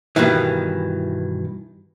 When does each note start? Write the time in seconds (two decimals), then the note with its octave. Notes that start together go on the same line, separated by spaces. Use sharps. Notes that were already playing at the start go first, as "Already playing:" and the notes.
0.16 G2 B2 D#3 E3